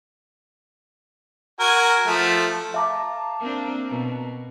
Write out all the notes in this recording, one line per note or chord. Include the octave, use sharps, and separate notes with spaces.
F#4 A#4 G#5
F3 A3
E5 F5 A5 A#5 D6
A#3 C4 D4
B2